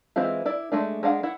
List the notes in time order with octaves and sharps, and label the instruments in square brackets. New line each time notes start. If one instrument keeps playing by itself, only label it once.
[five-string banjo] E3 G#3 C4 E4 F4
E4 D5
G#3 A3 D4
G#3 D4 F5 F#5
E4 F#5